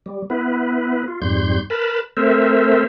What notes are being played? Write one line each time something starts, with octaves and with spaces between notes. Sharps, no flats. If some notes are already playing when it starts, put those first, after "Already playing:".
G3
B3 E4 B4
F4
F2 G#2 G3 C6 G6
A#4 B4 A5 B5
A3 C4 A4 A#4 C5 E5